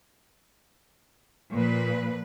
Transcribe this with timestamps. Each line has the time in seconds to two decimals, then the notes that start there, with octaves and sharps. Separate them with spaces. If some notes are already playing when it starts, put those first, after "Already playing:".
1.52 A#2 F3 B4